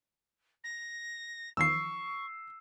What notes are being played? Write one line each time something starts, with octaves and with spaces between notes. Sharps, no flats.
A#6
E2 D#3 F3 C#6 E6 C7